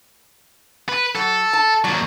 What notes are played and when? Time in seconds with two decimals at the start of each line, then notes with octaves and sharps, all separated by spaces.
0.89 B4
1.15 F#3 A4
1.53 A5
1.84 D#2 F#3 D5